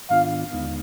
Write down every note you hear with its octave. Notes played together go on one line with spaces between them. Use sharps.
G#2 D#3 B3 D4 F4 F5
D#2 D3 G#3 B3 D#4